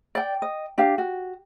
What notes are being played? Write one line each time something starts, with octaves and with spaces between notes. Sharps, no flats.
D5 G5
D#5
D4 G4 F5
F#4